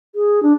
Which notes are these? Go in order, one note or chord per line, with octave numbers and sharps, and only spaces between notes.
G#4
D4